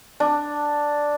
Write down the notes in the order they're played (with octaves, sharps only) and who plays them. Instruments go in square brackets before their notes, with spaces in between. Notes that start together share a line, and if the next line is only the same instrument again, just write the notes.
[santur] D4